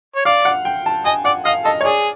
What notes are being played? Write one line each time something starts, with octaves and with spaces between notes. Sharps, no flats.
C#5
D5 F5
F#5
G5
A5
D#5 G#5
D5 F#5
D#5 F5
A4 D#5
C#5
G#4 D5